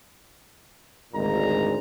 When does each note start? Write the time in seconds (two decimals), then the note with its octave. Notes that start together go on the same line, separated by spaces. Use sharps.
1.13 G#1 D2 A#2 G#3 A#5